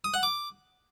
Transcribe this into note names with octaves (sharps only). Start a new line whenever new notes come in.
D#6
F#5
D6